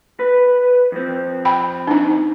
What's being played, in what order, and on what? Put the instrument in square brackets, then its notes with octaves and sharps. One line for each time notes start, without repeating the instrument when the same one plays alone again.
[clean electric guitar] B4
F2 C4
[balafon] G5 B5
D4 D#4